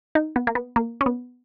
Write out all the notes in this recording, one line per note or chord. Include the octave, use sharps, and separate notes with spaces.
D#4
B3
A#3
B3
A#3
C#4
B3